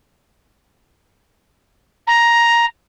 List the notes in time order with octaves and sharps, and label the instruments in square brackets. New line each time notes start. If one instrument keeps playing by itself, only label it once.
[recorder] A#5